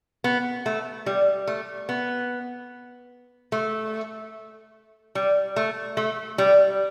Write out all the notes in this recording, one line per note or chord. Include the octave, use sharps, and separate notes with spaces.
B3
A3
G3
A3
B3
A3
G3
A3
A3
G3